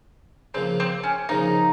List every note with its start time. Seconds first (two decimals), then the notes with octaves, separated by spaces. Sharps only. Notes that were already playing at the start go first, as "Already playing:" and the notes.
0.54 C#3 F3 A#3 C4
0.80 C4
1.03 C#4
1.29 C#3 F3 A#3 D#4